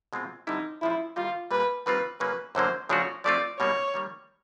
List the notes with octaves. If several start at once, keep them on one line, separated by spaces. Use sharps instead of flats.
B2 G#3 C4 F4
D3 G3 C4 D#4 E4
A#2 F3 G#3 C#4 E4 F4
D#3 G3 A#3 D#4 F4
A#2 G3 A#3 B4
D#3 G3 C4 F4 B4
C#3 F#3 A#3 C#4 B4
F#2 D3 F#3 A#3 C5
C#3 F3 A3 D4 F#4 C#5
F3 A3 C4 F4 D5
B2 G3 A#3 D#4 C#5
D#3 G3 A#3